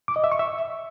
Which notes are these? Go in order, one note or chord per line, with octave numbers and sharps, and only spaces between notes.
D6
D#5
E5
C#6
E5